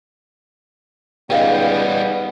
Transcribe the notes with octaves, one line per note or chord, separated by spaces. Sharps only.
C#2 G3 B3 D#4 D#5 F5 G5